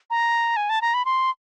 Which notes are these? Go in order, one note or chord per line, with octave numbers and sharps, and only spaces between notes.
A#5
G#5
A5
A#5
B5
C6